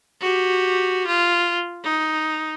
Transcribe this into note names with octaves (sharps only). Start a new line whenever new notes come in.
F#4 G4
F4
D#4